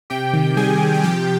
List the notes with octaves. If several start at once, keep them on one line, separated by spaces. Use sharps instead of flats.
C3 G4 G5
D#3
G3 G#4 G#5
C3
G#5
F3 G4 G5